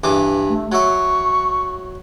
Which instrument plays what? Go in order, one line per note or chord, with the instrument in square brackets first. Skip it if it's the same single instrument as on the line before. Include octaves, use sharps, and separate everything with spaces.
[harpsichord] G2 E3 D6
[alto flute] A3
[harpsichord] F#3 E5 [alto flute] C#6